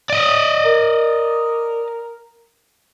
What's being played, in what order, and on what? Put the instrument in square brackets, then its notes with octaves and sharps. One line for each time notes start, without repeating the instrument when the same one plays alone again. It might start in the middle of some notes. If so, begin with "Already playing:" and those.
[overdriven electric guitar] D5 D#5
[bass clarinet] A#4